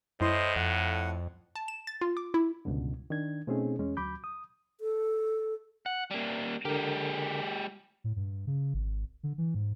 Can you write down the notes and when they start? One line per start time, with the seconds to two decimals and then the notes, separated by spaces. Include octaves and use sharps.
0.21 F#2 A2 E4 C5 D#5 C6
0.56 F2 F#5
1.55 A5
1.68 E7
1.87 A6
2.01 F4
2.17 D6
2.34 E4
2.65 C#2 G2 B2 D3
3.10 D#3 D4 G#6
3.47 B2 A3 C4 C#4 D#4 G#4
3.79 E2 G#3 C#4
3.97 D2 F#3 B5 D6 G6
4.24 D#6
4.81 A4
5.86 F#5
6.11 G3 A#3
6.65 D3 G#3 G4 A#4
8.04 A2
8.16 G2
8.47 C#3
8.74 G#1
9.23 D3
9.38 E3
9.55 G#2